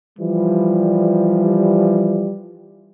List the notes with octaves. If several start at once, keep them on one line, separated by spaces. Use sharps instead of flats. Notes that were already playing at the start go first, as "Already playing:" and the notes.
E3 F3 G3